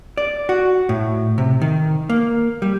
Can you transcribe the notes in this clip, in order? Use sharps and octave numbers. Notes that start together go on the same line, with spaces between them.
D5
F#4
A2
C3
D#3
A#3
G3